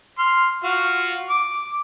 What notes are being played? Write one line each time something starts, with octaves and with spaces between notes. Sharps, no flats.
C6 F6
F4 F#4 F5
D6